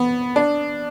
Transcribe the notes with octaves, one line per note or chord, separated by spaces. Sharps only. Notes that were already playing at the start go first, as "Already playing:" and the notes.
Already playing: B3
D4